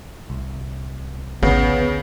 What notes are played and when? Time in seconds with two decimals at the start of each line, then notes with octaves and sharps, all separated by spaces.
0.30 C2
1.43 A1 D2 C#3 B3